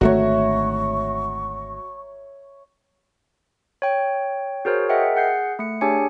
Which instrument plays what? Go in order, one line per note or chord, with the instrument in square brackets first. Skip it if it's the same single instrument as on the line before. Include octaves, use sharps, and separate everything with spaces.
[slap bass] G#1 D3 A3 [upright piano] F#4 [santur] C#5 E5 A#5 [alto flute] C#6
[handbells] C#5 G5
F#4 G#4 A#4 C5 C#5
G#4 A#4 D#5 E5 F#5 G5
G#4 F#5 G6 C7
A3 C#7
D4 G4 G#4 C#5 G#5 C#7